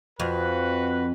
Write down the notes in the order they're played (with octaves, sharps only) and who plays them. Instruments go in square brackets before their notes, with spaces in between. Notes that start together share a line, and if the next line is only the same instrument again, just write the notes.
[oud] F2 [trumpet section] F#4 B4